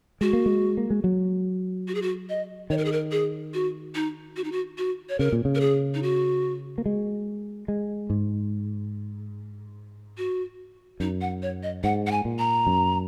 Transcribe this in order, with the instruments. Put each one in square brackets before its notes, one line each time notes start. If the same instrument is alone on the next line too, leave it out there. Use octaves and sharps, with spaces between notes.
[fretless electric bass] G#3 [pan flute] F#4
[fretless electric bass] A#3
G#3
A#3
G#3
F#3
[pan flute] F#4
G#4
F#4
D#5
[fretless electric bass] D#3 [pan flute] C#5
[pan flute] A#4
G#4
A#4
G#4
F#4
D#4
F#4
D#4
F#4
F#4
C#5
[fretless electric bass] C#3 [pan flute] A#4
[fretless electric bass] A#2
C#3
[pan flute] A#4
G#4
D#4
F#4
[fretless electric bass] A#3
G#3
G#3
G#2
[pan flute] F#4
[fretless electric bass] F#2 [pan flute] D#4
[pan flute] F#5
C#5
D#5
[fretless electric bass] G#2 [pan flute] F#5
[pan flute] F#5
G#5
[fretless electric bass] A#2
[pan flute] A#5
[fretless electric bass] F#2